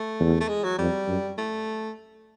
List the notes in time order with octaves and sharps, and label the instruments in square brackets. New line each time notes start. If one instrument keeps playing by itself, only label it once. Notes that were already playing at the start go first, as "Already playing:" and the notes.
Already playing: [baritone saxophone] A3
[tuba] E2
[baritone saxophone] A3
G#3
F#3
[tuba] F2 [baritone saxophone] G3
[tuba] F#2
[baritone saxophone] A3